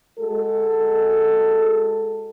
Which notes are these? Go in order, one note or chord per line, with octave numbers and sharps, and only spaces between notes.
G#3 F#4 G#4 A4